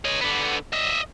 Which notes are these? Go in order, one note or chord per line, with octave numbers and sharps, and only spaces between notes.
C#5 D#5
D3 B3
D#5 E5